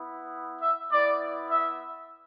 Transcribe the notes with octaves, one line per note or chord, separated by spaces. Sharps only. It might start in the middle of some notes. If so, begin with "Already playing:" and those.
Already playing: B3 E4
E5
B3 E4 D5
E5